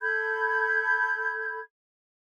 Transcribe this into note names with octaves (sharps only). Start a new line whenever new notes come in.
A4 B5 G6 G#6